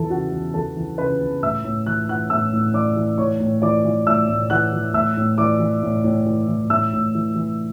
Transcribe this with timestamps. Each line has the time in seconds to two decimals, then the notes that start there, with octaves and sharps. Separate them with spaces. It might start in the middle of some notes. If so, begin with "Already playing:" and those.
Already playing: E2 E3 A4 A5
0.10 C#3 F#4 F#5
0.32 E2
0.54 E2 A4 A5
0.77 E3
0.98 C#3 B4 B5
1.21 E2
1.43 A2 E5 E6
1.64 A2
1.86 E3 F#6
2.09 E3 F#5 F#6
2.30 A2 E5 E6
2.53 A2
2.74 E3 D5 D6
2.96 E3
3.18 A2 C#5 C#6
3.40 A2
3.62 E3 D5 D6
3.85 E3
4.06 A2 E5 E6
4.29 A2
4.50 E3 F#5 F#6
4.73 E3
4.94 A2 E5 E6
5.17 A2
5.38 E3 D5 D6
5.60 E3
5.83 A2
6.04 A2
6.26 E3
6.48 E3
6.70 A2 E5 E6
6.93 A2
7.15 E3
7.36 E3